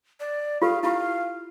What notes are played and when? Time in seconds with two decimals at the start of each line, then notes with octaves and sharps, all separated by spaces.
0.20 D5
0.62 F4 G4 A4 F5
0.83 E4 F4 G4 F5